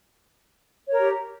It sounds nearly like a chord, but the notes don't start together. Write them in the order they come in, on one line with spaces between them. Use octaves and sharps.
C#5 A#4 G4